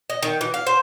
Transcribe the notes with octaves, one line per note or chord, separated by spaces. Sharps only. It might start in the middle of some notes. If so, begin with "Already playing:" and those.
D#5
D#3
E3
F5
C5